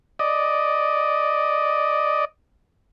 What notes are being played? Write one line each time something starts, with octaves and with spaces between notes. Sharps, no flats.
D5 D#5